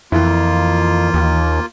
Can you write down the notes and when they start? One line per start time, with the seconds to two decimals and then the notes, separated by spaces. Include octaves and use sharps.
0.12 F2 E3 A#3 E4 F4
1.14 D#2